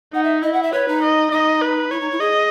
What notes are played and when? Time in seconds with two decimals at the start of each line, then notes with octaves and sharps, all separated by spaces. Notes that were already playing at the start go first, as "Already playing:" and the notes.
0.14 D#4 F#5
0.23 E5
0.42 E4 D#5
0.53 F#5
0.63 E5
0.72 B4 C#5
0.88 D#4
1.03 D#5
1.31 D#4 D#5
1.62 B4
1.90 E4 C#5
2.00 D#4
2.11 E4
2.20 G#4 D#5